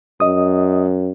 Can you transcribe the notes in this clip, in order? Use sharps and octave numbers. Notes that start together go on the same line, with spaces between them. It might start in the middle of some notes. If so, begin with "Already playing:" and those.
F#2 D#5 D#6